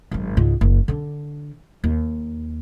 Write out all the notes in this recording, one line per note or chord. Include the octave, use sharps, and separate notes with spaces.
G#1 F#2
C#2 G#2
F#1
D3 D4
D#2